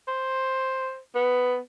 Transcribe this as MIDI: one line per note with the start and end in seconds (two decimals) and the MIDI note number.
0.08 0.98 72
1.15 1.59 59